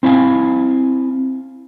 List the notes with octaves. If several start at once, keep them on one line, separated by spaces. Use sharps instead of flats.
C4 E4 F5 G#5